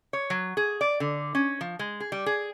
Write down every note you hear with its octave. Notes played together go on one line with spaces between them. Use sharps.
C#5
F#3
G#4
D5
D3
C#4
F3
G#3
G#4
G3
G#4